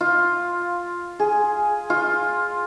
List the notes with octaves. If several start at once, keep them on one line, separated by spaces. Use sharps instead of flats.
F4
G#4
F4